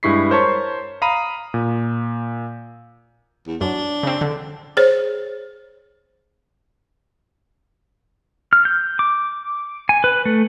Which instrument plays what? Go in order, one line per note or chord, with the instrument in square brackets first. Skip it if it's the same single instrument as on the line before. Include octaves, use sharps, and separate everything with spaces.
[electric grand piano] G2 G#3 E4 C#6 B6 C7
A#4 C5 C#5 A5 C#6
F5 A#5 B5 D#6 D#7
A#2
[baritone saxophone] E2
[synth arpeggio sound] F#2 [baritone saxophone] D4
[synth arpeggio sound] C#3 C4
D3
[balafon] G#4 C5 C#5
[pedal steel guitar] F6
G6
D6
G#5
B4
A3